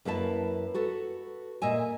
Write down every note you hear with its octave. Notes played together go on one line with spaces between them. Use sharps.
F#2 A#3 E4 B4 A5
F#4 A4 B4
A#2 D#5 E5 G#5